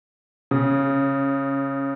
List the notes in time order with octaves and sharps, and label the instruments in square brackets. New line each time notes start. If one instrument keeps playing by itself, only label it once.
[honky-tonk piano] C#3